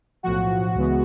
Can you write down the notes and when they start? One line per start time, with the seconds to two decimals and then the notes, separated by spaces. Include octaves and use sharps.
0.23 B1 A2 F3 F#4
0.75 C#2 C#3 E3 G#3 B3